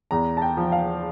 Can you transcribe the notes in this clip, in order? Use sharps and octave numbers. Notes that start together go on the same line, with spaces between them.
E2 A#5
A5
G5
F3
F5